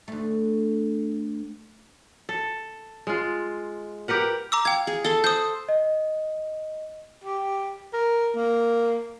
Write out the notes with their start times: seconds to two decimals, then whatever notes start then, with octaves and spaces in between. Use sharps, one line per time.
0.08 D2 A3
2.29 A4
3.07 G#3 F4
4.08 G4 A#4 B4 F#5
4.52 A#5 D6 E6
4.65 F5 G5 G#6
4.87 G#4
5.05 A4 C6
5.24 C5 D#6 G6
5.69 D#5
7.24 G4
7.93 A#4
8.35 A#3